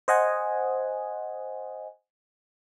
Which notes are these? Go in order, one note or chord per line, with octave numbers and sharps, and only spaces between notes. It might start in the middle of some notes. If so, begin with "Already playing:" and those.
C5 D#5 F#5 G#5